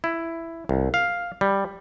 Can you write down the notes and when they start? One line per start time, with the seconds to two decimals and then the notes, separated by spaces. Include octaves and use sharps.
0.04 E4
0.69 C2
0.94 F5
1.41 G3